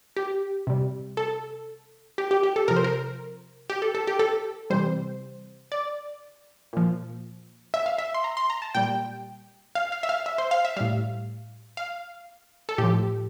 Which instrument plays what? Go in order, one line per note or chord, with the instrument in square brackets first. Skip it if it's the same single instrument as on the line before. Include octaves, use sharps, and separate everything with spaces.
[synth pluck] G4
C3 G3
A4
G4
G4
G4
A4
C3 F3 A#4
C5
A#4
G4
A4
A4
G4
A4
C3 E3 G3 C5
D5
A#2 F3
E5
F5
E5
C6
A#5
C6
A#5
A5
A#2 G3 G5
F5
F5
E5
F5
E5
C5
F5
E5
A2 G3 F5
F5
A4
A2 G4
F3